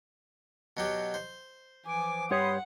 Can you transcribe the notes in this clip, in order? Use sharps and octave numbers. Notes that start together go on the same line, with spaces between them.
B2 F#3 G4
C5
E3 F3 G#5 D6
G2 G4 C#5 F#5 B5 C6 D#6